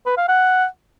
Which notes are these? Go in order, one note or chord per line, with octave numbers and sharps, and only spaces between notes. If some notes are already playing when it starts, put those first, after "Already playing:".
B4
F5
F#5